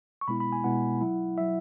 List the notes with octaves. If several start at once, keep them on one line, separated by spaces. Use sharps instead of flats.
C#6
B2 G#3 B3 E4 B5
B5
G#5
B2 G#3 B3 E4 F#5
F#3 E4
F#3 E4 E5